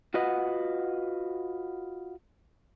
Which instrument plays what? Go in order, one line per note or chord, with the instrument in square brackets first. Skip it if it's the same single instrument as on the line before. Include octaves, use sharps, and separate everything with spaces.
[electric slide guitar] F4 F#4 B4 D#5 F#5